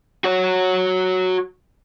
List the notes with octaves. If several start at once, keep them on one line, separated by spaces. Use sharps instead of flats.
F#4 C#5